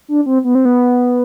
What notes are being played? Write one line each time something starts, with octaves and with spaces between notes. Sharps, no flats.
D4
C4
B3
C4
B3